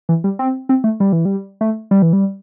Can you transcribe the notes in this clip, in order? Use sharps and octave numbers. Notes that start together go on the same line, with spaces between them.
E3
G3
C4
C4
A3
G3
E3
G3
A3
G3
E3
G3